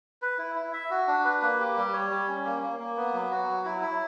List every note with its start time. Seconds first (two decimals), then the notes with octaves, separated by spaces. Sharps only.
0.22 B4
0.38 E4
0.56 E4
0.73 E5
0.91 F#4
1.07 D4
1.25 B4
1.42 A#3
1.59 G4
1.77 G3
1.94 C#5
2.10 G3
2.28 C#4
2.45 A#3
2.63 A#3
2.79 A#3
2.97 B3
3.13 F#3
3.31 F#4
3.48 F#3
3.65 E4
3.82 E4